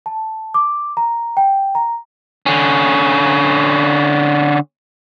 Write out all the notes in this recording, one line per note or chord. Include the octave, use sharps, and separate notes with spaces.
A5
D6
A#5
G5
A#5
D3 C#4